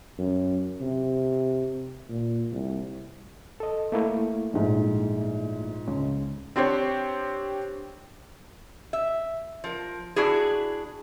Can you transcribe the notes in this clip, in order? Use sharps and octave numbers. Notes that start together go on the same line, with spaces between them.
F#2
C3
A#2
C2
A4 D#5
A3 A#3 E4
A#1 G#2
C#2 C#3 G#3
C4 D4 G4 C5 C#5
E5
F3 A#4
D4 E4 F#4 G#4